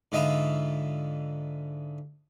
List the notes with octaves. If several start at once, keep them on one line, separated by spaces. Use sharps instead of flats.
G#2 D3 F4 D#5 E5 B5